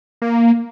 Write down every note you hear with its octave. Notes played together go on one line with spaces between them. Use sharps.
A#3